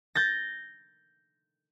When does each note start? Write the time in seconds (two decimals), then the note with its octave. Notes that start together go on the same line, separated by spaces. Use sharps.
0.15 G6 A6 A#6